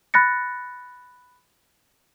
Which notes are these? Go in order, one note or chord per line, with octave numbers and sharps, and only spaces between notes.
B5 F#6 A6 A#6 C#7